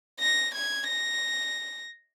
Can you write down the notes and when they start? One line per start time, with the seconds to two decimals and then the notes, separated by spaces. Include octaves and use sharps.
0.20 A#6
0.54 G#6
0.88 A#6